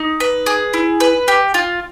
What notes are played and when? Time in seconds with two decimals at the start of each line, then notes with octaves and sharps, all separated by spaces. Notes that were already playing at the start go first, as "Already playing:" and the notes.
Already playing: D#4
0.20 B4
0.46 G#4
0.74 E4
1.00 B4
1.28 G4
1.54 F4